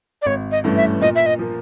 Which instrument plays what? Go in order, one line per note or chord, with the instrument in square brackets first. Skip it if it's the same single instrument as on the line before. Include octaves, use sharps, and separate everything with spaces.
[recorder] D5
[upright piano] G#1 [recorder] C#5
[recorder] D#5
[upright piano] G2 E3 A3 C#4
[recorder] E5
[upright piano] A#2 [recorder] D#5
[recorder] E5
D#5
[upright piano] F3 A#3